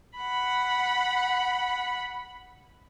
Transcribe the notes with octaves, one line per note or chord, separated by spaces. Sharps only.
F#5 B5